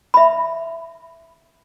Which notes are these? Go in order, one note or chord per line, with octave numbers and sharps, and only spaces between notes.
E5 B5